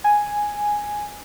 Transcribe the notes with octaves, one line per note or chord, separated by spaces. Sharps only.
G#5